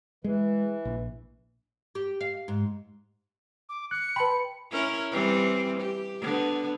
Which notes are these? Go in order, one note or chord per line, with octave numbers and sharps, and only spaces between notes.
E3 G#3
A#1
G4
F5
G#2
D6
F#6 C#7
B4 G5 A5 B5 C6
C#4 E4 A#4
E3 G3 C4
G4
D3 B3